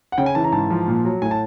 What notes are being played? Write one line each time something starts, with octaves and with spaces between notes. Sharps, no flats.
F#5
C#3 G5
G#5
E3 A5
A#5
G#2 A5
F3
A#2
F#3
A2 G#5
A5